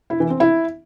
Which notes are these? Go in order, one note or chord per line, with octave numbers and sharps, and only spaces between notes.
E4
E3
C4
E4